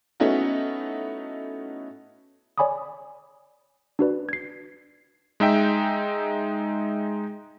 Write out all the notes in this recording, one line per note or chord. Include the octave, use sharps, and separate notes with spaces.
A3 B3 C#4 D#4 E4 F#4
C#5 D5 G#5 B5 D6 D#6
D4 F#4 B4 D5
G#6 C7
G#3 D#4 E5 G5